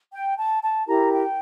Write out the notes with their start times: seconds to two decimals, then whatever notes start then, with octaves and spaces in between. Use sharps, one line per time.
0.12 G5
0.37 A5
0.63 A5
0.87 E4 G4 A#4 A#5
1.13 G5